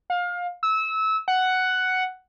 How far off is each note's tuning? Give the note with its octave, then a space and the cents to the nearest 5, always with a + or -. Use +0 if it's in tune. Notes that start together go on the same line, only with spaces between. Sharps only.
F5 +25
E6 -25
F#5 +5